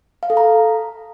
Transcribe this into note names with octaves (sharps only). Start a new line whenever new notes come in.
F5
A4
A#5